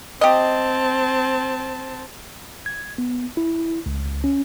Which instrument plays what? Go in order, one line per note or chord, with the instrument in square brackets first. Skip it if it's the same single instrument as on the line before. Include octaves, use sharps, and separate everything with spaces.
[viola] C4 A5 [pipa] G4 D#5
[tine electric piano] G#6
B3
E4
C#2
C#4